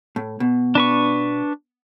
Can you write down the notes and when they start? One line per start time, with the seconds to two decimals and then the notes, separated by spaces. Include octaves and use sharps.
0.16 A2
0.40 B2
0.75 D4 B4 C#6